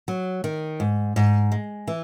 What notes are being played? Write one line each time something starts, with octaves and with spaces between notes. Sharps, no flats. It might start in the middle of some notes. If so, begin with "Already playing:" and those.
F#3
D#3
G#2
G#2
G#3
E3